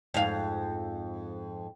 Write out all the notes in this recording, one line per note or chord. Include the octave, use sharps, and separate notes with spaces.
F2 G#2 F5